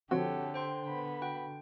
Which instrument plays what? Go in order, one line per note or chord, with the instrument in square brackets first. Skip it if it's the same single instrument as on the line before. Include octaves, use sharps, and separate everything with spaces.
[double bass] D3 [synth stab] F3 C4 F#4 [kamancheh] G4 A4 [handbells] C#5 F#5
[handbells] C5 G5 C6
[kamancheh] B3 B5
[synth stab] F#4 [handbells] G5